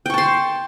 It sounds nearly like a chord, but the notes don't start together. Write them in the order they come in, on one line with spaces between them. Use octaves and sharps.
G5 C#6 A5 C6